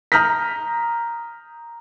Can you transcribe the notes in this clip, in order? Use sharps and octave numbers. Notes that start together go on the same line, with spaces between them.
A#5 D#6 F6 G6 A#6 B6